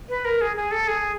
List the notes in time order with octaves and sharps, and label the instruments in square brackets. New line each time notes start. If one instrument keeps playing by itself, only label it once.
[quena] B4
A#4
G#4
G#4
A4
G#4